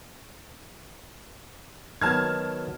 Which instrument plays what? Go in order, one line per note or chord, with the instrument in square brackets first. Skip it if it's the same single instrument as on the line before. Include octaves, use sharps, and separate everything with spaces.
[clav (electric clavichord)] D#3 F#3 B3 [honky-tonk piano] A5 F6 G#6